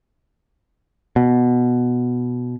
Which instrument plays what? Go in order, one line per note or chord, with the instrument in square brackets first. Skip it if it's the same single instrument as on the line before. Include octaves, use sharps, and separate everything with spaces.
[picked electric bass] B2